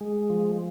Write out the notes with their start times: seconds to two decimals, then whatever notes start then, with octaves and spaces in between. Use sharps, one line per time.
0.01 G#3
0.30 F3